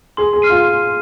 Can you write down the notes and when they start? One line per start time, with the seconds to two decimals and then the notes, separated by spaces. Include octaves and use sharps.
0.17 G#4 C6
0.33 G#4
0.42 F6 C7 D#7
0.50 F4